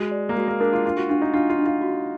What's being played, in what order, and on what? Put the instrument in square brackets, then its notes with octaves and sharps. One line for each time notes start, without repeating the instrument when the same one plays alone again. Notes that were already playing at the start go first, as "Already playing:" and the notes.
Already playing: [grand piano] G#3 [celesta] F#4
[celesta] D5
[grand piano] A#3
[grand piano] G#3 [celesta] F#4
[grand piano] A#3
[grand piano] D4 [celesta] A#4
[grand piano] F4
[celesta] D4 [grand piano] F4
[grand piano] F#4
[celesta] D4 [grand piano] F4
[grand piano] D#4
[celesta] D4 [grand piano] F4
[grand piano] F4
[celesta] D4
[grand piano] F4
[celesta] F#4